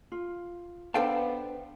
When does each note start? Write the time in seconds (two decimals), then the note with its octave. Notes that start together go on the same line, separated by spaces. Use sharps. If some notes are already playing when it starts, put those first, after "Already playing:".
0.12 F4
0.94 B3 D4 A4 C5 F5 G5 A5